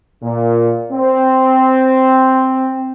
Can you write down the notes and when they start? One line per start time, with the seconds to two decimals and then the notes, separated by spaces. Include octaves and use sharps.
0.23 A#2
0.91 C4